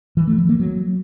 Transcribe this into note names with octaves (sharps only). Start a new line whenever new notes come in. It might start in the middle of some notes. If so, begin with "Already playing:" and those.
E3
A3
F3
A#3
F#3